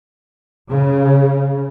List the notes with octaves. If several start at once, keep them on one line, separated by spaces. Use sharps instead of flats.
C#3